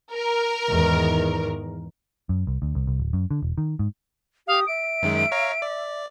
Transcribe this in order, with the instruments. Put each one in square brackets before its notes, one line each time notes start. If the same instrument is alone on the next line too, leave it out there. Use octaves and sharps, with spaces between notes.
[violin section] A#4
[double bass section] E2 G#2 D#3
[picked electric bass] F#2
C2
D2
C2
C2
D1
F#2
D3
E1
D#3
G#2
[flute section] G4 D#6 [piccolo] F5
[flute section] E5 [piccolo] D7
[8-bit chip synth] F#2 D#3 G#3
C#5 F5 A#5
D5